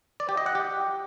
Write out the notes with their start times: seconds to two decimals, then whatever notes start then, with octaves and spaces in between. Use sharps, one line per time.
0.20 D5
0.29 G4
0.37 D#5
0.46 F#5
0.55 G4